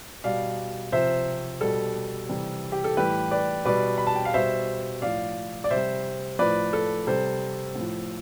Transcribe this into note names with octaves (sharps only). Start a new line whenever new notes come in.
B2 G3 D5 F5
C3 F3 C5 E5
B2 G3 A4
C3 E3 G3
G4
A4
A2 E3 G3 G4 B4
B4 D5
B2 G3 B4 D5
B5
A5
G5
F5
B2 G3 C5 E5
A2 F3 D5 F5
D5
C3 G3 C5 E5
A2 F3 B4 D5
A4
C3 G3 A4 C5
A2 F3